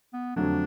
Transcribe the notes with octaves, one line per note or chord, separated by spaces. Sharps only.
B3
F2 D3 F#3 A3 D4